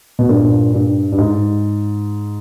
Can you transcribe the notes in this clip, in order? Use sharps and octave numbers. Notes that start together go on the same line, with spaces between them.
B2
G2 A#2
G2
G2
G#2